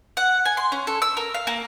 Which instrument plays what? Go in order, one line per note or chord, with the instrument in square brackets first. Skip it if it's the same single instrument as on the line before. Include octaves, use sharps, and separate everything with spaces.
[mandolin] F#5
G#5
C6
C#4
A4
E6
A#4
F5
A#3